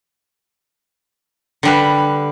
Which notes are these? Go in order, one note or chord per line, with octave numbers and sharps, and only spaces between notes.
D3 G3 B4